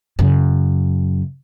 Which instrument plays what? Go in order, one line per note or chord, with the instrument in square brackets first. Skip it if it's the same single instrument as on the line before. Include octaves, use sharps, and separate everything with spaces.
[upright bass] F#2 C#3